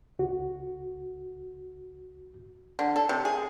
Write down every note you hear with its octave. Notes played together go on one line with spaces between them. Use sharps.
C#2 F#4
D3
A4
C3
G#4